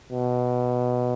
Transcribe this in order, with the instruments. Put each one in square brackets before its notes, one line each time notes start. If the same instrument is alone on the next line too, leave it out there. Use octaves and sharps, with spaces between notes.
[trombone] B2